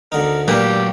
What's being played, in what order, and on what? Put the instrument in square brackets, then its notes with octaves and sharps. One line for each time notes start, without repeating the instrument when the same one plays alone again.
[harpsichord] D2 D3 D#4 [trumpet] A#4
[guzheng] A#2 [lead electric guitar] F#3 D5 [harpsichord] D4 A#4 B4 [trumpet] G4